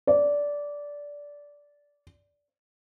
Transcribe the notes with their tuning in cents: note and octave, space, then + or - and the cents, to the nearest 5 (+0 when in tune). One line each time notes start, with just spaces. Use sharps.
D5 -15